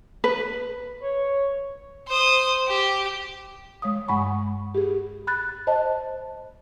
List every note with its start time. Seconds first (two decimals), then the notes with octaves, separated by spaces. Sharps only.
0.24 B4
1.03 C#5
2.08 C5 D#6
2.67 G4
3.82 G#3 C#5 F5 D#6
4.08 G2 G#3 F#5 G#5 B5 C#6
4.75 G4 G#4
5.27 B5 F#6 A6
5.67 C5 D#5 A5